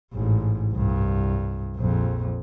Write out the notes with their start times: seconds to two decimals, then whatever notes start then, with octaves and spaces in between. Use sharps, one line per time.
0.14 A1 G#2
0.73 C2 G2
1.76 A#1 F2